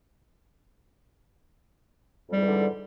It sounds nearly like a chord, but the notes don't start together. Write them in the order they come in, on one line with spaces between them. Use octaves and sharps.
F2 G3 G#2 E3 D3